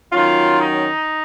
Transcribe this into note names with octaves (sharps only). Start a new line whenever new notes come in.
D#3 F#3 C#4 F4
D#4